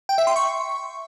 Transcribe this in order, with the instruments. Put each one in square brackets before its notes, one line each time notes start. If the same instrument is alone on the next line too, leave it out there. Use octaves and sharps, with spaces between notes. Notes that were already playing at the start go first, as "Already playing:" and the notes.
[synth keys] G5
E5
C6
C#6